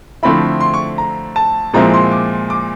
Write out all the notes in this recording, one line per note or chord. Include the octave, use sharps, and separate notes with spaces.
D3 F3 A3 C4 E4 B5
C6
C#6
A#5
A5
A#2 F3 G#3 C4 E4 A#5
C6
D6
D6